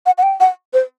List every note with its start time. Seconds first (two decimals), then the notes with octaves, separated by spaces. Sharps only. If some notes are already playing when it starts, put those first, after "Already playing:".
0.06 F#5
0.18 F#5
0.23 G5
0.40 F#5
0.73 C5